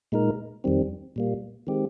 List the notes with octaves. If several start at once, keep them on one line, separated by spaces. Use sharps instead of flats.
A#2 G#3 D#4 A#4
F2 D#3 G3 C4
A#2 G3 A#3
D#3 G#3 C4 G4